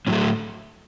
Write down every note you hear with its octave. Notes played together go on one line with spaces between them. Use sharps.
A2 F#3 A3 C#4